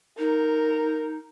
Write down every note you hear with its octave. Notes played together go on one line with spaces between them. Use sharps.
D#4 A#4